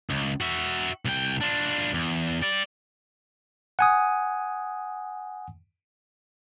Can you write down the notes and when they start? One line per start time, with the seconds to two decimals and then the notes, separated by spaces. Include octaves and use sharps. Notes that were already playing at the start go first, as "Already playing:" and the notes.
0.10 C#2
0.41 F#4 E5
1.05 C2 G5
1.41 D4 F4
1.94 E2
2.42 G4 D5
3.79 F#5 G#5 D#6